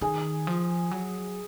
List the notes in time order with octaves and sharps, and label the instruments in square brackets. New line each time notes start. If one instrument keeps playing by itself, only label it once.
[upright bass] D#3 [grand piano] G#4
[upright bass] F3
F#3